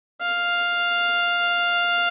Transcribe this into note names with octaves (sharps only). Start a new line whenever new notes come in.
F5